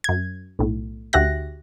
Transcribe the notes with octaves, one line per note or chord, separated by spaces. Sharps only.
F#2 G#6
B1 A2
D2 F#4 G4 E5 F#6 A#6